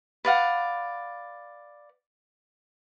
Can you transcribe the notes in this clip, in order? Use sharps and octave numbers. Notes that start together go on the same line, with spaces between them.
B4 D5 F5 F#5